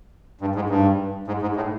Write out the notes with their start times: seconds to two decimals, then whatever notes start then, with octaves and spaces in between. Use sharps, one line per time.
0.41 G2
0.56 G#2
0.70 G2
1.28 G#2
1.42 G#2
1.56 A2